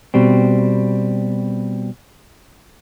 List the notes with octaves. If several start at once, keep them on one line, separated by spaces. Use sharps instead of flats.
B2 G3 C4